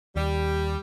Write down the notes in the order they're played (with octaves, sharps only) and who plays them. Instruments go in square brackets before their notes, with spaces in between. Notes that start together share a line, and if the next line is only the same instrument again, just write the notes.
[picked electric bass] D#2 [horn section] G3